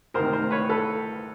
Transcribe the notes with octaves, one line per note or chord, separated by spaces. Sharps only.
D2 C3 D#3 A#4 C5
A#4 C5
B4 C#5
A4 B4